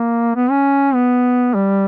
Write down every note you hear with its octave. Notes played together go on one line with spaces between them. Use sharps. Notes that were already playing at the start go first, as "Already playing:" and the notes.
Already playing: A#3
B3
C#4
B3
G3